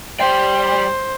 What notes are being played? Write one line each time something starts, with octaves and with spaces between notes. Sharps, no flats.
G3 C5 G5